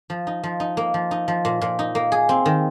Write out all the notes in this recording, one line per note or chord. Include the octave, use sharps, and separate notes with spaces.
F3
D#4
F3
D#4
A#3
F3
D#4
F3
A#2
A#2
D#4
A#3
G#4
C4
D#3